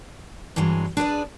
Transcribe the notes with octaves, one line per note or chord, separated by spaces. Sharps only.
G2 E3 F#3 G#3
D4 G#4 B4 D5